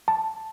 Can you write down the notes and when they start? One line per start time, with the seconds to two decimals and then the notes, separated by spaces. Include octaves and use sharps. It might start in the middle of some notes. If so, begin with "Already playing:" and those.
0.08 A5